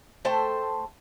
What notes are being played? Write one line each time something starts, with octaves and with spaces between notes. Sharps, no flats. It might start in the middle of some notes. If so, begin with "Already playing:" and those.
A3 A4 C5 G5